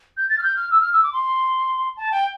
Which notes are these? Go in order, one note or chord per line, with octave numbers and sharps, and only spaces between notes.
G6
A6
F6
G6
F6
E6
F6
E6
D6
C6
A5
G5